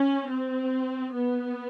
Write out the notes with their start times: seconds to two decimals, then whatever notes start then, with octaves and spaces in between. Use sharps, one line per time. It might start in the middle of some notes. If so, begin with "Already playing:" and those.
Already playing: C#4
0.30 C4
1.14 B3